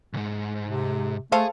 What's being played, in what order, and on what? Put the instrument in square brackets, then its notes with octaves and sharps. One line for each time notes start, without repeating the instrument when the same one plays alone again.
[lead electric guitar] B1 G#2
[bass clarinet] C3
[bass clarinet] A3 [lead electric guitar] G#4 [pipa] A4 C5 F5